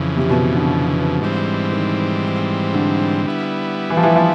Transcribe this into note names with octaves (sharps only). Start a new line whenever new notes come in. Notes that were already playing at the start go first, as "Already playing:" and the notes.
Already playing: F2 C#3 E3
C3
B2
D3
G#2 E3 G3 C4
D#3
D3
G3 B3 E4
E3
F3
E3
F3